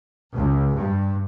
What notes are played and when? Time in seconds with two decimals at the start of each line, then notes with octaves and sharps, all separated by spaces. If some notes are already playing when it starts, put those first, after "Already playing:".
0.35 C#2
0.76 G2